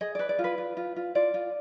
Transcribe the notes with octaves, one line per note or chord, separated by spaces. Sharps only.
G#4 D#5
B4 D5
D5
F4
B4
F4
F4
F4
F4 D5
F4